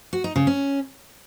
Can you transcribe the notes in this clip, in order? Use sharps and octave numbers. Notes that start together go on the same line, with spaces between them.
F#4
D#4
C#3
C#4